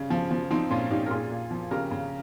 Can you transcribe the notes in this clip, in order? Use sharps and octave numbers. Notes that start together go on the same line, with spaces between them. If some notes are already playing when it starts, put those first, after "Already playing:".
Already playing: C#3 G3
F3
F3
F3 C4 D#4
A#2 C#4 F4
A#2 D#4 G4
A#4
A#2 F4 G#4
A#2
F3
C#3 G4 A#4
C#3